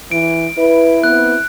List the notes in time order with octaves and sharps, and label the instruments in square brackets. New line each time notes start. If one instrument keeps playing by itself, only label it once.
[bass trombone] E3 [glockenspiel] D7
[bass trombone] E4 [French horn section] B4
[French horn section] B3 C4 B4 [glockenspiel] F#6